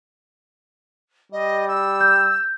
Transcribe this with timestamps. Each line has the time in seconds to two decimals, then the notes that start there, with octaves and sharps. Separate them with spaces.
1.32 G3 D#5
1.68 E6
2.01 G6